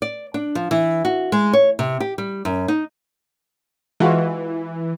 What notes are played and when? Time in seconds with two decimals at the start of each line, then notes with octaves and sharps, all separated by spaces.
0.02 D5
0.34 D4
0.55 F3
0.71 E3
1.05 F#4
1.32 G#3
1.53 C#5
1.79 C3
2.00 G4
2.18 G3
2.45 F#2
2.68 D#4
4.00 E3 G#3 F4 F#4